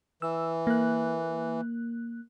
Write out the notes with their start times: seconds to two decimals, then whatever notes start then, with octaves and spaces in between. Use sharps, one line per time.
0.22 E3 E6
0.67 A#3 F#6